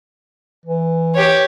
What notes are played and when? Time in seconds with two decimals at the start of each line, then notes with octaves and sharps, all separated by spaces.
0.66 E3
1.15 G4 C#5